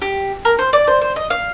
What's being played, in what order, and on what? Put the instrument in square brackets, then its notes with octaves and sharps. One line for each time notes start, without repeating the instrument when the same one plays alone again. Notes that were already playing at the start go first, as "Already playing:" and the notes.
[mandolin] G4
A#4
C5
D5
C5
C5
D#5
F5